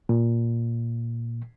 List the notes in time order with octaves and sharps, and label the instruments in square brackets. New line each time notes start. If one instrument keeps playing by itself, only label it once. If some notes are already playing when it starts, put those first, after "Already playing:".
[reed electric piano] A#2